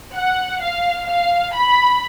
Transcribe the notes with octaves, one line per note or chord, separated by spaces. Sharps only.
F#5
F5
F5
B5